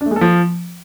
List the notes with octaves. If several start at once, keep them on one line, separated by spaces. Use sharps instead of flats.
D4
A3
G#3
A4
F3